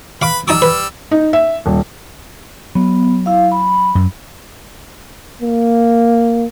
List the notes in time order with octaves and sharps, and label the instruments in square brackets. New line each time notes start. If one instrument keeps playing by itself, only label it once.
[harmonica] B4 B5 [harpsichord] F5 D6
[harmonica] G3 E6 [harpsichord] D#4 A5 D6
[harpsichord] B4
[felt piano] D#4
E5
D#1
[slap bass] F#3 [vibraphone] B3
[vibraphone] E4 F5
B5
[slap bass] F#2
[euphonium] A#3